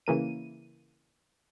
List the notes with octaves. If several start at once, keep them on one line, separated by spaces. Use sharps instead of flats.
C#3 E3 A#3 D#7